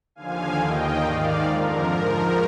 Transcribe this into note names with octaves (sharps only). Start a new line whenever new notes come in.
D#2 D3 F3 F5 G#5
D#2 D#3 D#5 G5
G#2 D#3 D5 F5
F2 D3 F3 A#4
G#2 F3 A#4